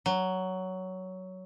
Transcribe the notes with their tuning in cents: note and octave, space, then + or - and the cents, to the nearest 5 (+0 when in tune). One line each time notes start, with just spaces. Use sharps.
F#3 +10